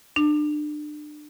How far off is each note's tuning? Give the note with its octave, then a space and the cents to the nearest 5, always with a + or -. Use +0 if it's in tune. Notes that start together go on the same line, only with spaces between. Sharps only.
D4 +30